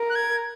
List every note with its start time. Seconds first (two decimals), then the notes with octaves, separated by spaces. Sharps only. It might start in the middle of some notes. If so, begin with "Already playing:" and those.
Already playing: A#4
0.10 F#6
0.15 G#6